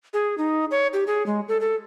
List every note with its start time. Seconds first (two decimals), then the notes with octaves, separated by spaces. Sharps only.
0.14 G#4
0.38 D#4
0.71 C#5
0.93 G4
1.07 G#4
1.26 G#3
1.48 A4
1.61 A4